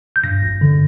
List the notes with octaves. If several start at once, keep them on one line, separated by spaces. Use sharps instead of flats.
G6
G2 A#6
G1
D3